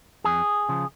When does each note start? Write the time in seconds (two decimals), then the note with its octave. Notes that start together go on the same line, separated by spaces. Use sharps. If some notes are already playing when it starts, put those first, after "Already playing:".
0.24 F2 G#4
0.69 C#3 F3